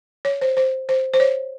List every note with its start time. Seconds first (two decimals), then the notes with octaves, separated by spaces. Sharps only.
0.25 C#5
0.41 C5
0.57 C5
0.89 C5
1.14 C5
1.20 C#5